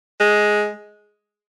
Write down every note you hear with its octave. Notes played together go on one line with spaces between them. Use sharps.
G#3